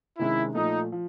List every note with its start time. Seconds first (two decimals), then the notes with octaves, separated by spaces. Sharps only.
0.18 C3 D#3 G#3 C#4 E4
0.55 A#2 F3 A3 D#4
0.92 F3